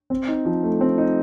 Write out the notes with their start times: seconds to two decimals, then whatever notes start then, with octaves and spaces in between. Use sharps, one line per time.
0.10 C4
0.28 D#4
0.45 F3
0.63 A3
0.81 C4
0.98 D#4